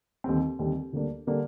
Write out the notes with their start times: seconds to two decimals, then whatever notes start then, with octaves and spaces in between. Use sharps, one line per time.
0.24 D#2 D3 G3 C4
0.59 D#2 D3 G3 C4
0.93 D2 D3 G3 A#3 D4
1.27 D3 G3 A#3 D4